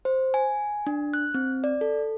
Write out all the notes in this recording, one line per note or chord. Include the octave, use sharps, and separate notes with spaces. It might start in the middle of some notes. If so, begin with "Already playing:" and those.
C5
G#5
D4
F#6
C4
D5
A4